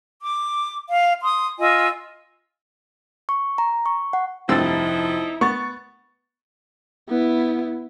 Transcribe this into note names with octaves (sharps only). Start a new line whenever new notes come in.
D6
F5
C6 D#6
F4 D#5 G#5 E6
C#6
A#5
C#6
F#5
F1 G2 F3 C4 D#4 E4 E6 A6
B3 C#6 A6
B3 E4